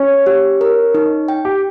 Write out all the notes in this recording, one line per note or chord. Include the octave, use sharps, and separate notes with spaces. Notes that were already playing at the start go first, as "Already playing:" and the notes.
Already playing: C#4 C#5
G4
A#4
D#4
G5
G4